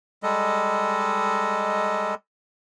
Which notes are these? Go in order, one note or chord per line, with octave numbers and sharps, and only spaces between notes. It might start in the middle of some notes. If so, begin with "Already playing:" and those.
G3 G#3 A4 D#5